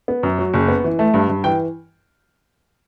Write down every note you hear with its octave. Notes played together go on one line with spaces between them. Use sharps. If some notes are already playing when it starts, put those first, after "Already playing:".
B3
F#2
F#3
F#1
B3
E3
A3
G2
G2
E3 G5